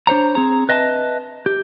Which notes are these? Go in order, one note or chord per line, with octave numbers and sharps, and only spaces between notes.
D4 C5 C#5 A#5
C4 G#4 A#5
B4 D#5 E5 G#5 A5
G4